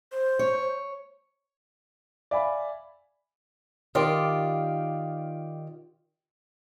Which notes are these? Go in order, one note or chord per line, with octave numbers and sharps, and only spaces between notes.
C5
C#5
D5 E5 F5 G#5 B5
D#3 F4 G4 D5